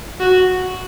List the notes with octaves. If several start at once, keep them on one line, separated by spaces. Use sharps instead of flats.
F#4